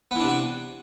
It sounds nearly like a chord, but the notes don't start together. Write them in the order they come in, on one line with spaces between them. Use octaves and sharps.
B3 E3 D4 C3 F#4